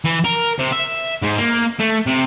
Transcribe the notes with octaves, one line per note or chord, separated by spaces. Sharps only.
E3
A#4
C3
E5
G#2
A#3
A3
C3